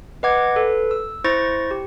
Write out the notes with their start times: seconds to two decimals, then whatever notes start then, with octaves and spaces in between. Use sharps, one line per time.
0.23 B4 D#5 F#5 D6 G#6
0.56 A4 B4
0.91 E6
1.24 E4 C5 C#6 A6 A#6
1.71 G4